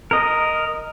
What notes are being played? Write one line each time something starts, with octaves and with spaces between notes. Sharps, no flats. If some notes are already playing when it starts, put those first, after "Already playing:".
A#4 D#5